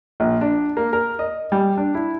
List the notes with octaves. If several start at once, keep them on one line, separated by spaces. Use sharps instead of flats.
A#1
D4
A#3
A#4
D#5
G3
D4
E4